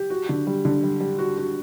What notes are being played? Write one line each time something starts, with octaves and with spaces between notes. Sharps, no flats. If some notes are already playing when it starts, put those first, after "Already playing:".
Already playing: G4
F#4
D3
G3
D3
G3
G3
F#4
F#4